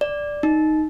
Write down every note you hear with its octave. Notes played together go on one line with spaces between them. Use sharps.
D5
D#4